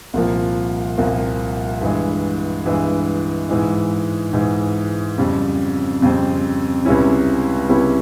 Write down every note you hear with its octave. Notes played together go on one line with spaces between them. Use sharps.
C2 A#2 F3 A#3
C2 A#2 F3 A#3
G2 E3 G#3
G2 E3 G#3
G#2 E3 G#3
G#2 E3 G#3
F2 C#3 G3 C4
F2 C#3 G3 C4
C#2 C3 G3 C#4 E4
C#2 C3 G3 C#4 E4